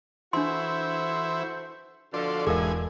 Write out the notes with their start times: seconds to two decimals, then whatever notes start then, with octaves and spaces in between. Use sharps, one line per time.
0.33 E3 D4 E4 F#4 A4 C5 C6
2.14 B2 D3 F3 D5 C6
2.47 E1 G#2 E3 A4 A#4 F5 G#5